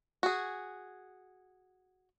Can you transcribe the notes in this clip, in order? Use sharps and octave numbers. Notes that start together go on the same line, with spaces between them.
F#4 G#4